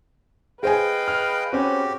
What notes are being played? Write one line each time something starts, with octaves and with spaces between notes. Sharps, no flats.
G#4 B4 C5 D#5 F5 G5 G#5
F6
C4 C#4 F#4 G4